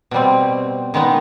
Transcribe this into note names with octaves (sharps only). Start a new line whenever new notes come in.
B2 G3 C4
D#3 G#3 B3 D#4